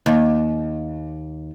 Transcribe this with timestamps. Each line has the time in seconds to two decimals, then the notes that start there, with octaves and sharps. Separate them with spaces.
0.06 D#2